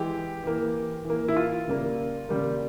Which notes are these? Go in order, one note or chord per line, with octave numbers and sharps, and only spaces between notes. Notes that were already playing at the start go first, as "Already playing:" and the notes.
Already playing: E3 G#3 G4
E3 A#3
E3 A#3
E4
F4
C#3 G3 A#3
C#3 G3 A#3